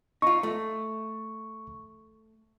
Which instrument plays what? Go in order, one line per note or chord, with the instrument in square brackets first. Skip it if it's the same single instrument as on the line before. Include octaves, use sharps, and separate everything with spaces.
[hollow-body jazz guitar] D#4 F4 [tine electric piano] C#6
[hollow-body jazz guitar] A3